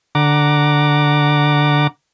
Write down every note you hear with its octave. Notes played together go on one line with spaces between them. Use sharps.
D3 F#5 A#5 D6